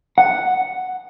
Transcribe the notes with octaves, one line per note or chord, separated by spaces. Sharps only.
F#5